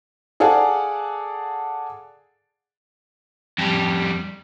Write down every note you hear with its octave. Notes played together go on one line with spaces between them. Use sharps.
G#4 A4 D5 F5 F#5
F2 G3